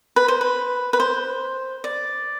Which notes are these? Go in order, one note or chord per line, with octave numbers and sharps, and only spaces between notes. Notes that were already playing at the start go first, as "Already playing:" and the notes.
B4
C5
B4
B4
C5
D5